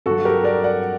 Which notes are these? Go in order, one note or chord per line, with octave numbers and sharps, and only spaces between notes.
G2 F#3 F#4 A4
G4 A#4
A#4 D5
D5 F#5